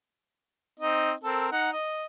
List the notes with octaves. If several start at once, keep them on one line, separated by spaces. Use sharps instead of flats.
C4 D#4 D#5
C4 A4 A#4
D#4 F#5
D#5